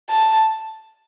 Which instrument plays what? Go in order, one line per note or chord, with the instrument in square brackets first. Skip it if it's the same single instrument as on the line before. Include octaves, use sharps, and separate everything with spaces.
[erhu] A5